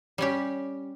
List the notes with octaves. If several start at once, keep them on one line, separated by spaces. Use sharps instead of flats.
G3 C#4 G4